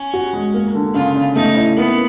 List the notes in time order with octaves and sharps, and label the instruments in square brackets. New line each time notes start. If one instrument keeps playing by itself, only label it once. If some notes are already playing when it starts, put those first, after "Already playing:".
Already playing: [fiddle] C#4
[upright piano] F#4
G#3
A#3
D3
[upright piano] C#3 [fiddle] F4
[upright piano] C#3
[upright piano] A3 [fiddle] D#4
[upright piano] E4
[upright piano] A#3 [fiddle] B3